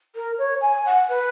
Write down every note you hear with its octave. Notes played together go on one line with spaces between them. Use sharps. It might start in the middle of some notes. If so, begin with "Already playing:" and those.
A#4
C#5
G#5
F#5
B4